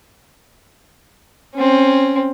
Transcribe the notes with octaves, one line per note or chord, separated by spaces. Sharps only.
C4 C#4